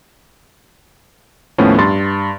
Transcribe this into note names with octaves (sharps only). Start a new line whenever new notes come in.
D#2 A2 F3 A3 B3 C#4
G2 C6 A6